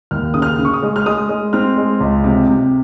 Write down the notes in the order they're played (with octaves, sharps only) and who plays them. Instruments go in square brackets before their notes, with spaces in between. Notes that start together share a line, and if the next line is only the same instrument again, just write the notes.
[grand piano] D#2 F6
C#3 D#6
F6
C#3
C#6
D#6
G#3
F6
G#3 D#6
G#3
C4 F6
G#3
C#2
C3
C3